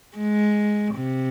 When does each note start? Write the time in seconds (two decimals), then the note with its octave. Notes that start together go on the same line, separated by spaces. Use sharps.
0.17 G#3
0.95 C3